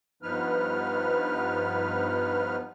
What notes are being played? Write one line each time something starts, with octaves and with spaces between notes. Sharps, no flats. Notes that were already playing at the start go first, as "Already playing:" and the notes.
G2 F3 B3 D#4 B4 F6